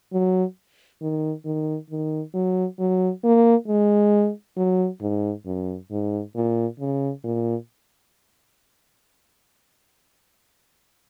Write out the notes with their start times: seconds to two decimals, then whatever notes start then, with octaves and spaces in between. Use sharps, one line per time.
0.13 F#3
1.02 D#3
1.45 D#3
1.91 D#3
2.34 F#3
2.79 F#3
3.24 A#3
3.68 G#3
4.57 F#3
5.02 G#2
5.46 F#2
5.91 G#2
6.36 A#2
6.80 C#3
7.24 A#2